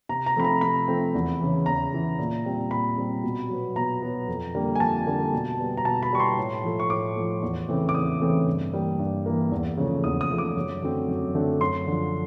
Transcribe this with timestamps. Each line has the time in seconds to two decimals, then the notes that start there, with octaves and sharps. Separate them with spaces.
0.09 C3 A#5
0.26 A#5
0.36 F3 A3 C4 B5
0.44 A#5
0.61 C3 B5
0.88 F3 A3 C4
1.14 E2
1.40 C#3 E3
1.66 E2 A#5
1.93 C#3 E3
2.19 A#2
2.45 G3 C4
2.71 A#2 B5
2.97 G3 C4
3.24 B2
3.49 F#3 B3
3.76 B2 A#5
4.02 F#3 B3
4.28 F2
4.54 D3 G3 A#3
4.75 G#5
4.80 F2 A5
5.07 D3 G3 A#3
5.33 B2
5.59 G3 B3
5.77 A#5
5.85 B2 A5
6.03 B5
6.11 G3 B3 C#6
6.20 C6
6.38 A2
6.64 F3 A3
6.80 C#6
6.90 A2 D6
7.16 F3 A3
7.42 E2
7.69 C#3 E3 A3 C4
7.89 D6
7.94 E2 D#6
8.21 C#3 E3 A3 C4
8.47 G2
8.73 E3 G3 A#3
8.99 G2
9.26 E3 G3 A#3
9.51 E2
9.77 C#3 F3 A3
10.04 E2 D#6
10.21 D#6
10.30 C#3 F3 A3
10.38 D6
10.56 F#2
10.82 D3 F#3 A3 C4
11.08 F#2
11.35 D3 F#3 A3 C4
11.61 F#2 C6
11.87 D3 F3